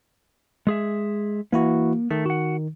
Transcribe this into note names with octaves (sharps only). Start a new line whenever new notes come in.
G#3 G#4 E5
E3 A#3 E4 F#4
D#3 A3
F#4 F#5